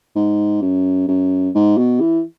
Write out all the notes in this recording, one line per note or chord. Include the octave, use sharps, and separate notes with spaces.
G#2
F#2
F#2
G#2
B2
E3